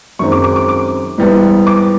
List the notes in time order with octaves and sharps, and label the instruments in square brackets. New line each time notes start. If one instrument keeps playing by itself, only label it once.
[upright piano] F#2 D#3 G#3 C4 C#6
D6
D6
D6
D6
G#2 E3 G3 B3
D6